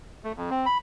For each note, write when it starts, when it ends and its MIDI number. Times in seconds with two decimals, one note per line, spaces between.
0.24 0.32 57
0.37 0.50 41
0.50 0.66 60
0.66 0.78 83